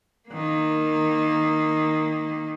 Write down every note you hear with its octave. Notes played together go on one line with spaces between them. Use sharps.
D#3 A#3